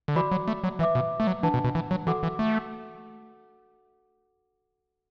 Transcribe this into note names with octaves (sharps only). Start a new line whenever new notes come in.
D3
E3 F#4 D5 B5 D6
F#3
A3
F#3
E3 B4 E5 D6
B2
A3
F#3
E3 D4 B4 F#5 A5
B2
B2
E3
F#3
E3 F#4 A4 F#5 D6
E3
A3